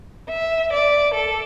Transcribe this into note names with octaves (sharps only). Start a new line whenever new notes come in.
E5
D5
A4